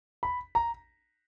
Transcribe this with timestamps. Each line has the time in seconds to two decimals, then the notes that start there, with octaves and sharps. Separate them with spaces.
0.23 B5
0.55 A#5